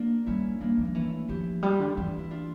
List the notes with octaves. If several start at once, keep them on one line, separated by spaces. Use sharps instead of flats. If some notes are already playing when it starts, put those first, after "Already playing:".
Already playing: A#3 D4 E4
G3 C#4 E4
G3 A#3 D4
F3
A#3
E3 A3 C#4
F3 E4 G4
G3 F4
G4
D3 D4 F4
E3 E4 G4
E4
D4 F4